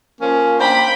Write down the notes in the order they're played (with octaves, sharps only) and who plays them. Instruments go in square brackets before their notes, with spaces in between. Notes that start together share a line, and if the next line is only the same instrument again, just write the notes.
[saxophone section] F3 A#3 C#4
[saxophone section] A#3 D4 C5 [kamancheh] G5 B5